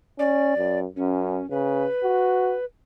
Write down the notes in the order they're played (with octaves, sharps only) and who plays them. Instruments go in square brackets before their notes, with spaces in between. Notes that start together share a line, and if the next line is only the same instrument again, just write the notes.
[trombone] C#4 [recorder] D5
[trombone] F#2
[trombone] F#2 [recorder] C#4
[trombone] C#3 [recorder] B4
[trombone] F#4